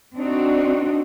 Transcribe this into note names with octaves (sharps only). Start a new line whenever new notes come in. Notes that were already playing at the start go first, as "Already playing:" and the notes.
C4 D4 D#4 F#4